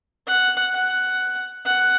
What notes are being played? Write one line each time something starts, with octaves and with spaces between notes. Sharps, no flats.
F#5
F#5
F#5